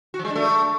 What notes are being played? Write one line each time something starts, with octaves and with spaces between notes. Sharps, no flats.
F#4
F3
G#3
D4
A3